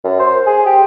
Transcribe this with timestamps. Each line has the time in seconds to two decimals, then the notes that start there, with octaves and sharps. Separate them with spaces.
0.04 F#2
0.19 C5
0.47 G#4
0.66 G4